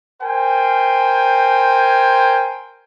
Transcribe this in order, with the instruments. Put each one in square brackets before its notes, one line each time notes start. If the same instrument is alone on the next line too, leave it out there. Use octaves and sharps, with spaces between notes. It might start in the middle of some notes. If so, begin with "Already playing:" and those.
[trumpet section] A#4 C5 G5 G#5